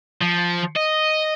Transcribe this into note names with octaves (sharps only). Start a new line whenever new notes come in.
F3
D#5